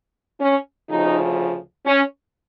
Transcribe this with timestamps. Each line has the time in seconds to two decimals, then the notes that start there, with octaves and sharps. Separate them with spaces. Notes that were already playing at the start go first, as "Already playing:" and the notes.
0.41 C#4
0.89 D2 C#3 F3 D#4
1.86 C#4